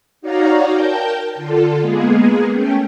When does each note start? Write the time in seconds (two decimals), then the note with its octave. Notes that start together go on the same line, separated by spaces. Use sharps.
0.21 D#4 F#4 C#5 D5 F5 A#5
0.72 A#4 G5 A5 G6
1.35 D3 F4 A4
1.81 G#3 A#3 B3 G#4
2.50 A3 C#4 G5